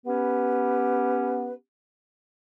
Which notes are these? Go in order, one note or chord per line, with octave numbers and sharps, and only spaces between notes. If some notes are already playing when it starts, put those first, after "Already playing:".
B3 C#4 G4 B4